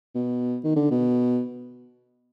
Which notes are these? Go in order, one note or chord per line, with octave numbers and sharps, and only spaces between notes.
B2
D#3
D3
B2